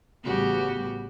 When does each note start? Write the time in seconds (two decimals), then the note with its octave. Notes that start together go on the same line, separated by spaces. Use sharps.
0.24 A1 C#3 G3 B3 F#4 G4